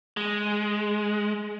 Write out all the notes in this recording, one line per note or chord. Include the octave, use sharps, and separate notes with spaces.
G#3